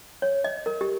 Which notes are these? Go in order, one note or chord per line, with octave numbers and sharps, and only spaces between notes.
C#5
D#5
A#4
G4